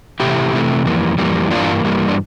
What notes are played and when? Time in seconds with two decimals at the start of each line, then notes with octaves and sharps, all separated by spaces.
0.20 C3 E3 A3 E4 G4
0.53 C3 E3 A3
0.85 F2 E3 G3 A#3
1.18 F2 E3 G3 A#3
1.51 G2 E3 G3 A#3 D4 F4
1.84 G2 E3 G3 A#3
2.09 D4